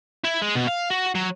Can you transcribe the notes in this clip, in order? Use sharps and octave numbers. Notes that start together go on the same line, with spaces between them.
E4
G#3
B2
F5
F#4
F#3